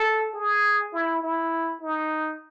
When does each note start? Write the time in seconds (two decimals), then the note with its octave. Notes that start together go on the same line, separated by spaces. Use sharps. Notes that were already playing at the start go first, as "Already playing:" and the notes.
Already playing: A4
0.34 G#4
0.93 E4
1.23 E4
1.82 D#4